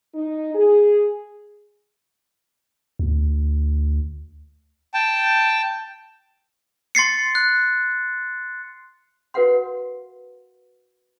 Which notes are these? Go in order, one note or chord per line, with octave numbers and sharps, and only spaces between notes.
D#4
G#4
D2
G5 A5
C6 A6 C7 C#7
F#6
F#4 A#4 B4 F5 F#5 C6